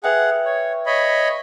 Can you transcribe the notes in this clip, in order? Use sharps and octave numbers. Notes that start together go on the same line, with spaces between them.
G#4 B4 E5 F#5 G5
C#5
C#5 D#5 B5